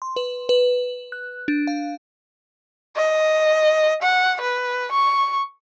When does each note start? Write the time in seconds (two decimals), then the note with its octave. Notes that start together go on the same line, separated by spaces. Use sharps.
0.02 C6
0.16 B4
0.49 B4
1.12 F#6
1.48 D4
1.67 F5
2.96 D#5
4.02 F#5
4.41 B4
4.91 C#6